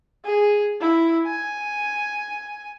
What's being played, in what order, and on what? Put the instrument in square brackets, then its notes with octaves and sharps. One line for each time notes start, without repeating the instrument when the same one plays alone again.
[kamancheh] G#4
E4
G#5